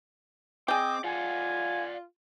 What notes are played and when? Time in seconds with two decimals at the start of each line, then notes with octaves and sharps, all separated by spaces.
0.68 C4 G#4 D#5 G5 D6
1.04 F4 D5 F5 F#5 G#5